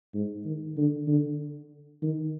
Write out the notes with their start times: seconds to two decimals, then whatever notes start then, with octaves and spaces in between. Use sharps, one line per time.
0.14 G#2
0.45 D#3
0.77 D3
1.08 D3
2.02 D#3